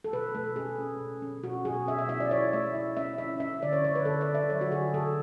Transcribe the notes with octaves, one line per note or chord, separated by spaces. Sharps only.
A4
B2 B4
A3 A4
C#4 G#4
C#4
B2
C#4
B2 F#4
B2 G#4
C#4 E5
E5
E4 E5
D5
E4 C#5
A3 E5
E4
C#4 E5
E4 E5
C#4 E5
D3 D5
C#5
D3 C#5
B4
D3 A4
D5
D3
E5
F#3 C#5
F#4
D3 G#4
D3 A4